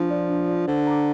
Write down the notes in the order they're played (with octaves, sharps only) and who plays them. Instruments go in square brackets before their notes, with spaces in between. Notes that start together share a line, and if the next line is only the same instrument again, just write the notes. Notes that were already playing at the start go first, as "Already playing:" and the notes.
Already playing: [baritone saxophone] F3 [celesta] D4
[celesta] F4 D5
D4
F4 D5
[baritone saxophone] D3 [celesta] C5
[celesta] A#5 D6